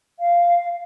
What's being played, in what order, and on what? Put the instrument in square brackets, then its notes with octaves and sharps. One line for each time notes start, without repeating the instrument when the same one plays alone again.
[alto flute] F5